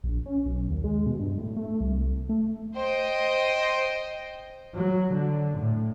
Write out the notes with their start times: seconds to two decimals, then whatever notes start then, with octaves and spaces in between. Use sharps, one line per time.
0.04 A#1
0.26 C#4
0.46 B1
0.70 D#2
0.84 G#3
1.06 B2
1.19 G2
1.38 A2
1.56 A3
1.81 C2
2.29 A3
2.75 C5 D#5 G5
4.75 F#3
5.13 D3
5.58 A2